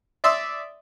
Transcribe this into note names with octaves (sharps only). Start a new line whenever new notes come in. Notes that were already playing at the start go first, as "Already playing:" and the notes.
D5 E5 C6 D#6 E6